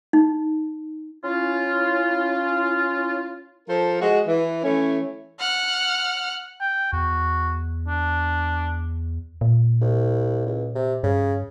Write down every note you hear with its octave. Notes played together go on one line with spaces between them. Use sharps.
D#4
C#4 E4 F4
F3 A4 A#4 C5
G#3 F#4
E3
E3 A3 C#4
F#5 F6
G5
E2 F#4
D4
A#2
C2
C#2
C3
G2 C#3